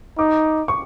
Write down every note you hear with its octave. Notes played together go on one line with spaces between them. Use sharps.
D#4 D6
C#6